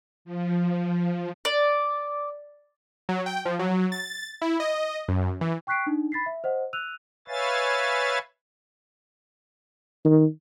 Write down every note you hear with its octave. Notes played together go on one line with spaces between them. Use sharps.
F3
D5
F#3
G5
F3
F#3
A6
E4
D#5
F#2
E3
G5 C#6 F#6 B6 C7 D7
D4 D#4
B5 A6 B6 C7
E5
C5 D#5 F#5
E6 F#6 D#7 F7
B4 C#5 E5 F5 G#5 A6
D#3